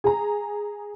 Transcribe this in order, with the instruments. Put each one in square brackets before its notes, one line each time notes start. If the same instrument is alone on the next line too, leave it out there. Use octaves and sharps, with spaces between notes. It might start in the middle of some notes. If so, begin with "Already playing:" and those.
[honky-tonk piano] G#4 A#5